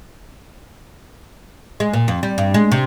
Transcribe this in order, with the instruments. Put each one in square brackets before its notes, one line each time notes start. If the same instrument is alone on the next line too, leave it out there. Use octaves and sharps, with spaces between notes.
[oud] G#3
A#2
F2
G3
G2
G#3
C3